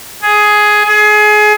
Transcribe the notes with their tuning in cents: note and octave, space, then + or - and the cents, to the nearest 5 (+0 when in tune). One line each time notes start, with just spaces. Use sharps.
G#4 +10
G#4 +25